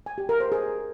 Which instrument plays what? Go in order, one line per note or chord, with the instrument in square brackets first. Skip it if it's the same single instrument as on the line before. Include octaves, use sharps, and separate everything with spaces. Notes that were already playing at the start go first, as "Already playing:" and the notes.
[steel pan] G#5
G4
A#4
C5
G#4